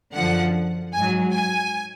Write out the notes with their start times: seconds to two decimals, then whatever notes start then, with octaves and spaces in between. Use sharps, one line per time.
0.14 F#2 D3 F3 F#5
0.93 G#2 F#3 G#5
1.32 G#5